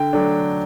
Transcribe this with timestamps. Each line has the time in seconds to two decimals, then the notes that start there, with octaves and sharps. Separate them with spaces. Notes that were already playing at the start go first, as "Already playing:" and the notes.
Already playing: D3 G5
0.13 F#3 A3 D4